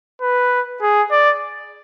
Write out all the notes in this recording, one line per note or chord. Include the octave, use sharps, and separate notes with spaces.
B4
G#4
D5